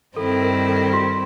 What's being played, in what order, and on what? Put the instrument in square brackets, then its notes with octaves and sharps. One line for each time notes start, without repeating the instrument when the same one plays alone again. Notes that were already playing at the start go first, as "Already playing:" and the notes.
[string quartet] G2 D#3 G3 C4 E4 [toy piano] A4
[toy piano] A#4
A4
F#4